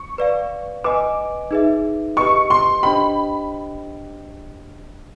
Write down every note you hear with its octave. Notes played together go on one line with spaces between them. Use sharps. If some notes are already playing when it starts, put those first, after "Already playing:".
Already playing: C#6
B4 D5 F5
B4 D#5 G#5 D6
D#4 G#4 B4 E5
G4 B4 D#5 C#6
C6
D4 G4 C5 D#5 G5 B5